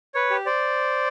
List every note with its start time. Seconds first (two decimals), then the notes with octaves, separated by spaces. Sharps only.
0.14 B4 C#5
0.30 G4
0.46 C5 D5